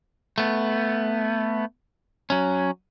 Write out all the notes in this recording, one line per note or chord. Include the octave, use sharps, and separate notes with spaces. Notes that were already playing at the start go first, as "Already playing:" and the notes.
A3 B3
F#3 C#4